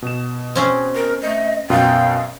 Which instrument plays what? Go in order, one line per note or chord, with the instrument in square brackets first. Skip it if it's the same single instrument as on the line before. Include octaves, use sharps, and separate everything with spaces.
[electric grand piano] B2 E7
[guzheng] C4 C#4 G#4
[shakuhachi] A#4
[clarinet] A3 [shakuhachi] D#5
[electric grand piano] F#2 B2 [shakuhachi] F5 [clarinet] G5